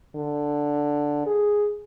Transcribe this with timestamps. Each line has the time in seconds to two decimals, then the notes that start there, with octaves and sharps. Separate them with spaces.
0.15 D3
1.26 G#4